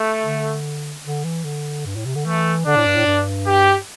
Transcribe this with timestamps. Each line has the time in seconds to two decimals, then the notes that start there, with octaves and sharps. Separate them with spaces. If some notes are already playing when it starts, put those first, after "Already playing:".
Already playing: A3
0.23 D3
1.04 D3
1.24 E3
1.44 D3
1.86 G2
1.96 A2
2.05 C3
2.15 D3
2.25 E3 A3
2.66 D3 D4
2.76 A2
2.86 G2
2.96 A2
3.06 G2
3.47 G4